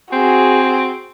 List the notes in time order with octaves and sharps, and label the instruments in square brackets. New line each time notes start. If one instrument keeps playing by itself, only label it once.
[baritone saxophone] C4 [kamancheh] F#4 G#4